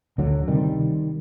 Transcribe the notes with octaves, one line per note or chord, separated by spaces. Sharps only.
D2 D3 F#3
C3 D#3 G3